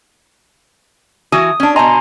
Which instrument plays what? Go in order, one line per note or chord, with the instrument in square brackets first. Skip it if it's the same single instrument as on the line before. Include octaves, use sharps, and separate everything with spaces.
[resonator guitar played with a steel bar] E3 F#4 G#5 [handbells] D#6
[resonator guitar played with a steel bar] C#4 D4
[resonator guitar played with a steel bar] B2 D#5 [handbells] G#5 A#5 C6